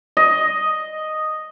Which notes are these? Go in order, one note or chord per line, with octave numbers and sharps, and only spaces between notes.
D#5